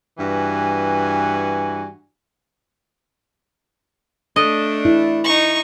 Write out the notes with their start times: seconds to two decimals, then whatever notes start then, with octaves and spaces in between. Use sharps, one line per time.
0.18 G2 E3 F#4 G#5
4.36 A3 D4 D#5
4.85 E4
5.24 D#4 C#6